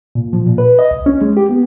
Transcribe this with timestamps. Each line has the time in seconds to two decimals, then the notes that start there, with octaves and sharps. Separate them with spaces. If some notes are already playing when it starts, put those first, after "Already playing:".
0.15 A#2
0.33 F3
0.46 A#2
0.58 B4
0.79 D#5
0.91 C2
1.06 C#4
1.21 G#3
1.37 G4
1.49 B3